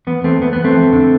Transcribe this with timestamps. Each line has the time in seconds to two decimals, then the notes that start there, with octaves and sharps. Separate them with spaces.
0.07 E2 B3
0.24 E2 A3 C4
0.41 E2 B3
0.53 B3
0.58 E2
0.64 A3 C4
0.75 F2
0.93 D3